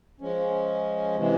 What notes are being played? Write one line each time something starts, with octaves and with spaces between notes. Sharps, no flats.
F3 G#3 C#4
C3 E3 G#3